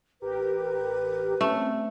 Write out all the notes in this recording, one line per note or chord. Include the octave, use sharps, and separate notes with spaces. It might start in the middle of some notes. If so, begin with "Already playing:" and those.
A1 G4 A#4 B4
A3 C4 C#4